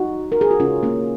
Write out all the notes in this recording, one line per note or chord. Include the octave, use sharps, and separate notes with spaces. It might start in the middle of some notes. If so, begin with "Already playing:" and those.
Already playing: D#4 F#4
A#4
G#4
F#4
C#3 G#3 C#4 F4
A#3 C#4